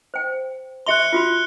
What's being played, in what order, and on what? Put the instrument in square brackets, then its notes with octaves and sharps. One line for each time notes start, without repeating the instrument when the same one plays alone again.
[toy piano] C5 G5
[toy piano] G4 E5 C6 [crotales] F#6 C#7 G7
[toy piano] F4 F#4 B5 [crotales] F6